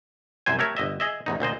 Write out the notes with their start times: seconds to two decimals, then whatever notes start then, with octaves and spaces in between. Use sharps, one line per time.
0.46 C2 F#2 C5 G#5
0.59 A3 G4 A#4 C#5 E5
0.77 G1 D#5 E5
1.00 G#4 D#5 E5
1.26 A1 E2 D#4
1.40 D2 A#2 C5 D#5